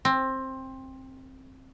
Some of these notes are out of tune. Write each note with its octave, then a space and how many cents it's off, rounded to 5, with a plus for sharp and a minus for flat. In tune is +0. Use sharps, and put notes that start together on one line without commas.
C4 +15